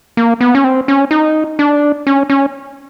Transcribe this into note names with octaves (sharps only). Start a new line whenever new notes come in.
A#3
B3
C#4
C4
C#4
D#4
D4
C#4
C#4